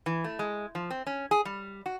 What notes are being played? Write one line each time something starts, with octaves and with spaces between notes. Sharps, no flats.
E3
A3
G#3
F3
C4
C#4
G#4
G3
F#4